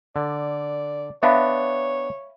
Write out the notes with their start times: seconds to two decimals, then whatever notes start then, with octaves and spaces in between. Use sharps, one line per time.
0.16 D3 D5
1.23 B3 D4 C#5 E5 F5 B5